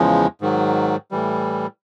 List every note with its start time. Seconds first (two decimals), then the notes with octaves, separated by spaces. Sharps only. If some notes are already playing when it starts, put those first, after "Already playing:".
Already playing: E2 C#3 F3 G#3
0.41 G#2 D#3 F#3
1.11 A2 E3 G3